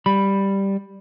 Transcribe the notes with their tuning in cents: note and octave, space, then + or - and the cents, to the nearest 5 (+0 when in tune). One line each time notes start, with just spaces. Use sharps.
G3 +0 B5 +0